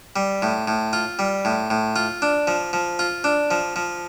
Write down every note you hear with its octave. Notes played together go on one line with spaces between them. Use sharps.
G3
A2
A2
F4
G3
A2
A2
F4
D4
F3
F3
F4
D4
F3
F3